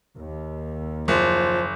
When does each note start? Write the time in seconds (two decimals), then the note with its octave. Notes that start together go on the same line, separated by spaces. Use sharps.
0.16 D#2
1.08 F#1 F3